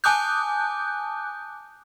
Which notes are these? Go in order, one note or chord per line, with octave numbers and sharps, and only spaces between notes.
G#5 A5 D6 D#6 F#6 G6